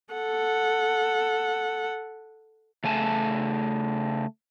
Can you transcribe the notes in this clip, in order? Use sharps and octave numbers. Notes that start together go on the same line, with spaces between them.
A4 F#5
C#3 A3 G#5 A5